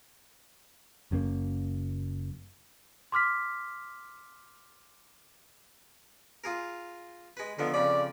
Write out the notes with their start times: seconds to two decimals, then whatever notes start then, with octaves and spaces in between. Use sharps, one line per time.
1.11 F#1 F#2 B2 A#3
3.12 C6 D6 F6 B6
6.44 F4 G#4 A#4
7.37 G#3 B4
7.59 D3 D#3 F3 B3
7.74 F2 C#3 D5 B5